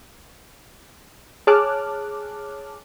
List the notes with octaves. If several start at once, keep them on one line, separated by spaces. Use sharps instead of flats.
G#4 C#5 A5 D6 F6 F#6